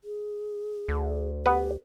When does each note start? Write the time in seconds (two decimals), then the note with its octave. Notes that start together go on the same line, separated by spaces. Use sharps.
0.04 G#4
0.88 D2
1.46 B3 G4 B4